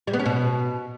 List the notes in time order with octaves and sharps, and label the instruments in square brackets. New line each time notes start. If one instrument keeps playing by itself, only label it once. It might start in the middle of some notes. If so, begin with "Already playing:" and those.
[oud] G3
B3
C#4
B2